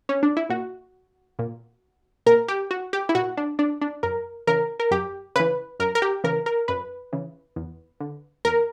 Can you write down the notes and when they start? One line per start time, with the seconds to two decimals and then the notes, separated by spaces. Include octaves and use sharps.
0.09 C#4
0.23 D4
0.37 E4
0.50 A#2 F#4
1.39 A#2
2.26 A#2 A#4
2.48 G4
2.71 F#4
2.93 G4
3.09 E4
3.15 A#2 F#4
3.37 D4
3.59 D4
3.81 D4
4.03 F#2 A#4
4.47 C#3 E3 A#4
4.80 A#4
4.91 F#2 G4
5.36 C#3 E3 B4
5.80 F#2 A#4
5.95 A#4
6.02 G4
6.24 C#3 E3 A#4
6.46 A#4
6.68 F#2 B4
7.13 C#3 E3
7.56 E2
8.00 D3
8.45 E2 A#4